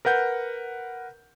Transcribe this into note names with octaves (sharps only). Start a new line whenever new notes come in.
A#4 B4 F#5 G6